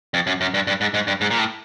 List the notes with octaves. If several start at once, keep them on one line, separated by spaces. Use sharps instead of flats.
F2
F#2
F#2
G2
G2
G#2
G#2
G2
G#2
A#2
A2